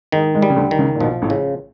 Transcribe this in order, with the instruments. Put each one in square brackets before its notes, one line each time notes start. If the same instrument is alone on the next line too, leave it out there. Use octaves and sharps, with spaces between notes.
[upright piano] G#2 G#3 [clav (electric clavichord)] D#3
[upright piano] G#2 G#3
[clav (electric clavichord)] G3
[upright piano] C#3
D2 D3
[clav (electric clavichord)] D#3
[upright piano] C#2 C#3
A#2
[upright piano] B1 B2 [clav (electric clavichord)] F3
[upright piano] A1 A2
[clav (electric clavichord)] C#3